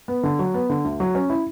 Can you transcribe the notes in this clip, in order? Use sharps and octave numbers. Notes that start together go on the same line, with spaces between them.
B3
D3
F#3
B3
D3
D2
F#3
C#4
E4